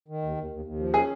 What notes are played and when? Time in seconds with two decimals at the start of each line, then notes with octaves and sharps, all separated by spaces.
0.08 D#3
0.22 D#2
0.37 D#2
0.51 D#2
0.65 D#2
0.79 F3
0.94 C#4 G#4